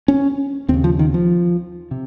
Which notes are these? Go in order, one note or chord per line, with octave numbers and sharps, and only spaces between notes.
C#4
D#2 C4
C#3
F3
D#3
F3
C3